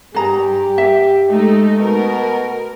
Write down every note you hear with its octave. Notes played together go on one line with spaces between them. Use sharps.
G2 G4 G#4 A#5
E5
G#3 A3 D#4
B2 A#4